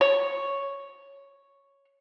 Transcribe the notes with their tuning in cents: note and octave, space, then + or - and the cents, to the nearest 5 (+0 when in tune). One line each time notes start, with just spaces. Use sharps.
C#5 +0